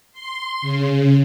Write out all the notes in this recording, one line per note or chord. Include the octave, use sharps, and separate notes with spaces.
C6
C#3